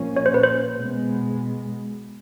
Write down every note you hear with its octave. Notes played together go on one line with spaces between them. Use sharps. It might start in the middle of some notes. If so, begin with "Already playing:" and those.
Already playing: A#2 F3 A#3 C#4
C#5
C5
B4
C5
B2 G#3 B3